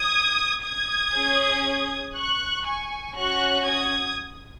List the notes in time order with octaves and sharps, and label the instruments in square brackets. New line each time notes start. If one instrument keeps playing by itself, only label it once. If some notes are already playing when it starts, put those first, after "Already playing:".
Already playing: [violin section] D#6 G#6
D#6 G#6
C#4 G#4
C#6 F#6
G#5 C#6
C#4 F#4 C#6 F#6
D#6 G#6